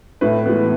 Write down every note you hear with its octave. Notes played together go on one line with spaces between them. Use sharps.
A2 B4
E3 G#3 B3